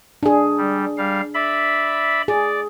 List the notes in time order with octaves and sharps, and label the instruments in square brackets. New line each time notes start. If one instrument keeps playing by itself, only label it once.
[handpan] D4 G#4
[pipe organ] G3
G3 F5
D5 E5 B5
[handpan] G#4 [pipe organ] D5